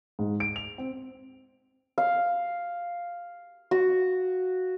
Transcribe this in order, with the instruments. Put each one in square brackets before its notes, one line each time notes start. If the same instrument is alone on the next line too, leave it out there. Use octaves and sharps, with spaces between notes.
[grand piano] G#2
D7
F7
C4
[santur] F5
F#4